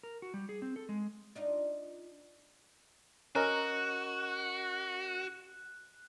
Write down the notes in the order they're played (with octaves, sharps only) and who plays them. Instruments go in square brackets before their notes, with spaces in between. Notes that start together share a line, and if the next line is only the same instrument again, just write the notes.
[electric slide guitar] A#4
F#4
G3
G#4
C4
A4
G#3
[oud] D4 D#4 F4
[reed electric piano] C#4 A#4 D#5 [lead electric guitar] F#4 [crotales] F#6